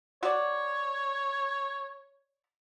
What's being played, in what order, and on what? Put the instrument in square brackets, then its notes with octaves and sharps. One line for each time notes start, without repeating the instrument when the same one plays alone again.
[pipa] F#4 D5 [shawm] C#5